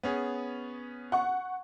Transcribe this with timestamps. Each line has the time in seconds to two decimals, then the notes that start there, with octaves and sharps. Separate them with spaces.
0.03 B3 C#4 G#4
1.12 F#5 C#6